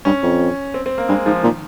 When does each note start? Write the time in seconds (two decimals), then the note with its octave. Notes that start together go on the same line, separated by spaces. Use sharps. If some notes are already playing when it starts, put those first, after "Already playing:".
0.05 G2 C#4
0.23 F2
0.74 C4
0.86 C4
0.98 A#3
1.08 G2 G#3
1.26 G#2 F3
1.43 A#2 D#3